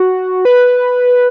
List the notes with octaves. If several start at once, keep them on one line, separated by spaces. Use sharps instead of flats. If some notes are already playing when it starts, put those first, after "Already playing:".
Already playing: F#4
B4